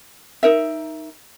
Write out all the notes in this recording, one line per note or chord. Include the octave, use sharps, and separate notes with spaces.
D#4 A#4 E5